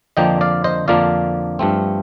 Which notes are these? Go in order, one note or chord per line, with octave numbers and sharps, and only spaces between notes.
F2 D3 F3 A#3 D4 D#5 G5
D5 F5
C5 D#5
F2 D3 F3 A#3 D4 D5 F5
G2 F3 A3 C4